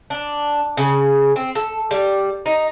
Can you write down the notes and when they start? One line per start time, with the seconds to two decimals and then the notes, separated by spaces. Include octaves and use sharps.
0.10 D4
0.77 C#3
1.36 C4
1.55 A4
1.91 G3
2.46 D#4